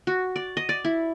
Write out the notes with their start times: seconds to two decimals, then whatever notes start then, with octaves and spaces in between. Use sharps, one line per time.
0.07 F#4
0.36 D5
0.57 D#5
0.69 D5
0.85 E4